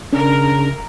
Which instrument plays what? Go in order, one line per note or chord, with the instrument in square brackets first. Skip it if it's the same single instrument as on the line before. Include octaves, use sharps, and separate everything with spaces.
[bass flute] C#3 [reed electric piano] C#4 D4 [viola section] A#4